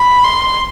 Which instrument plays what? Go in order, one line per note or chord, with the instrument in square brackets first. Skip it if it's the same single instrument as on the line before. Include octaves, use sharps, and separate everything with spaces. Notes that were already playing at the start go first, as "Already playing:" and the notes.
Already playing: [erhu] B5
C6